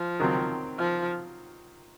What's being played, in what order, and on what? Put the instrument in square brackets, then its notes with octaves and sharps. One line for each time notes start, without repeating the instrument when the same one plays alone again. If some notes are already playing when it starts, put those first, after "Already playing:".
Already playing: [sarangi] F3
[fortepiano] D#3 F#3 C4
[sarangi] F3